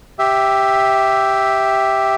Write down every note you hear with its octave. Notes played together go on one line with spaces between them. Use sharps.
G4 E5